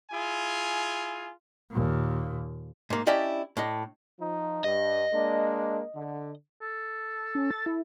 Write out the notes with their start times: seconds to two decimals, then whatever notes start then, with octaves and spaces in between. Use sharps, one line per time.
0.11 E4 F4 G#4 G#5
1.70 D#2 A#2
2.90 G#2 A#3
3.07 C#4 D4 E4 G4 D5 D#5
3.57 A2 D4 D#5
4.20 F3 D#4
4.64 G2 D#5
5.13 G#3 A#3 D4
5.95 D3
6.61 A4
7.35 C#4
7.51 A6
7.66 E4